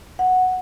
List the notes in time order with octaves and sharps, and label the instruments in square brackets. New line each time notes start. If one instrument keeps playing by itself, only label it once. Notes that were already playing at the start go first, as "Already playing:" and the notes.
[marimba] F#5